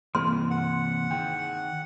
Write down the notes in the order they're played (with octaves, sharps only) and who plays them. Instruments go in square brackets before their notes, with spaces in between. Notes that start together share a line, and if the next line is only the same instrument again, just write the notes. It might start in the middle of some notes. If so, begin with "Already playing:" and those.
[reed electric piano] G2 A#3 [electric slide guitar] C3 E3 [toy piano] C6
[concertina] F#5
[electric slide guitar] D#3 G#4 [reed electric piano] G5